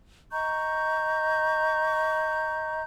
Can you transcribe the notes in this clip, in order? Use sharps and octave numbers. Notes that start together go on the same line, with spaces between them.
D#5 A#5 C#6 G6